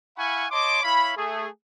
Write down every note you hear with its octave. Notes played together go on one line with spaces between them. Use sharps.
E4 F5 F#5 G#5 B5 C#6
C#5 D#5 A5 C6 D6
E4 C#5 F5 B5
A3 G#4